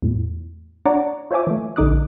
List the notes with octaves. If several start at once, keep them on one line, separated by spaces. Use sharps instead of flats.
E2 A2
D4 C#5 D5 F#5 A#5 D6
F4 C5 C#5 E5 G#5 D6
E3 A3
A#1 D3 D#4 D6 D#6 F#6